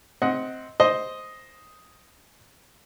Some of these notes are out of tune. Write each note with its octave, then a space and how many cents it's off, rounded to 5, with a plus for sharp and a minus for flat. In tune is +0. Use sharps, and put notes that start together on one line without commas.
C4 +0 D#5 +20 F#5 +0
C5 +0 D#5 +5